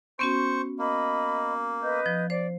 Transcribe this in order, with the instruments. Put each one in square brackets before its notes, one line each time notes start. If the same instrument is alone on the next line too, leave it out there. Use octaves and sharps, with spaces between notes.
[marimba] B3 C#4 F#4 [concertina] C5 C#6
[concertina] A#3 [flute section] D#5 B5
[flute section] B4 D#5 G6
[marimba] F3
[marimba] C5 [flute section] D5